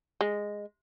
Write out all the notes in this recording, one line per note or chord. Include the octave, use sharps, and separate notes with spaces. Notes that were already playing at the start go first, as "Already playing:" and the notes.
G#3